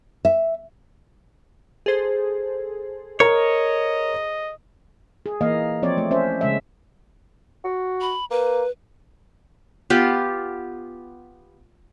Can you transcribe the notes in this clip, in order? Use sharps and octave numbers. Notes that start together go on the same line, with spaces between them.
E5
G#4 A4 C5
A#4 C#5 D#5 A#5
G#4
E3 A#3 D#5 F5
F3 C4 C#5 D5
A3
C#4 C5 E5
C#3 G#3 E5
F#4
B5
A#3 B4
B3 F4 G4